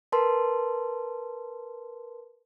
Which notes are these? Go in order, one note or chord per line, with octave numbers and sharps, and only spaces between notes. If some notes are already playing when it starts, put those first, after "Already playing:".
A#4 B4 A5 C6